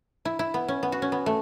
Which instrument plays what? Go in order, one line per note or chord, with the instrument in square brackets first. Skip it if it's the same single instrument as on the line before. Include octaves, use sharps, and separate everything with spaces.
[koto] E4
E4
B3
C#4
B3
F#4
C#4
B3
A3